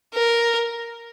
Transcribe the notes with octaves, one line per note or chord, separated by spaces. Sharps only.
A#4